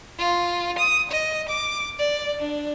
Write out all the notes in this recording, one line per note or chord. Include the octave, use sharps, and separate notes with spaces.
F4
D#6
D#5
D6
D5
D4